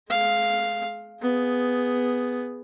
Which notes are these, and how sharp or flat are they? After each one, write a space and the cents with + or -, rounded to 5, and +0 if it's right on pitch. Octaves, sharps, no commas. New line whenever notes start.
G#3 +35 F5 +0
B3 +5 G#4 +0